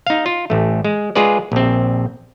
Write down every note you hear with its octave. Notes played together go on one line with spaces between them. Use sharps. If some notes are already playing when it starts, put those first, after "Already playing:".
D#4 F5
F4
A1 A3
G#3
G#3 F4 G#4 B4 D5
A#1 C4